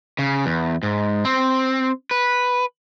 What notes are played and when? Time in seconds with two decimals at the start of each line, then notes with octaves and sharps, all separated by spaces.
0.19 C#3
0.46 E2
0.83 G#2
1.25 C4
2.11 B4